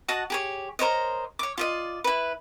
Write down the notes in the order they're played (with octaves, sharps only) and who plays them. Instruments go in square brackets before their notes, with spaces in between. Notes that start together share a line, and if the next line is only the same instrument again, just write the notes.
[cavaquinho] F#4 D#5 F#5 A5
G4 G#4 C#5
A#4 C5 C#5 D#5
C#5 D6
F4 D5 D#5
E4 B4